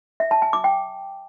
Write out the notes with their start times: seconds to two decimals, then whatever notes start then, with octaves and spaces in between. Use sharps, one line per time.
0.20 E5
0.31 A5
0.42 G#5
0.53 D6
0.64 G5